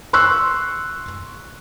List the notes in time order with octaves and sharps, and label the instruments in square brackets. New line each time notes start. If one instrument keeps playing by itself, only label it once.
[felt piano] C6 C#6 E6 F#6